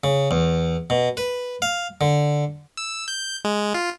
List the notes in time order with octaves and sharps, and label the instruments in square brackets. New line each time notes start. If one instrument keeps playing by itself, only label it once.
[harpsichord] C#3
E2
B2
B4
F5
D3
[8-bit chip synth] E6
G6
G#3
F4